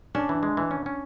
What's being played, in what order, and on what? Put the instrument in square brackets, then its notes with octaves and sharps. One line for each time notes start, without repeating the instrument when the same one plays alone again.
[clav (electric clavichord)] C#4 [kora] D4
[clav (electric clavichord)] E3
G#3
E3
C#4
C#4